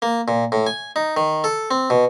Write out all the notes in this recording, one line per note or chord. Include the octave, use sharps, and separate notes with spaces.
A#3
A#2
A2
G#5
D#4
D#3
A4
C4
B2